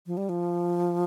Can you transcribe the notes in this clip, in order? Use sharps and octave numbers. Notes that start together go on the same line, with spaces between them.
F3
G3
F3